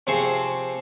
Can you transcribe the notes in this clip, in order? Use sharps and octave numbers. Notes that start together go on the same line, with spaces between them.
C3 F3 C4 G#4 C5 C#6